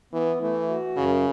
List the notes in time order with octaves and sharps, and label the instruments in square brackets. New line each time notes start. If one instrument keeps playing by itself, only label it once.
[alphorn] E3 [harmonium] B3
[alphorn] E3 [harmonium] A3
[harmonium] F#4
[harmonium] F#2 [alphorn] C#3